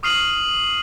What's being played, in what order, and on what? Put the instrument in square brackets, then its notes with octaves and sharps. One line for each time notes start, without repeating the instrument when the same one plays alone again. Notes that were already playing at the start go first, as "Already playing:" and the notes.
[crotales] C#6 D#6 F6 C7 D#7 F#7